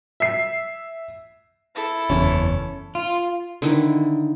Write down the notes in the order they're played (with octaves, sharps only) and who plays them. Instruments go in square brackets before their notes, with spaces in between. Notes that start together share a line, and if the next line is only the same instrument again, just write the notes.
[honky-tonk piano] E5 C7
[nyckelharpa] E4 A4
[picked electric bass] F#1 E2 [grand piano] C#4
[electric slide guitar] F4
[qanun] D3 D#3 E4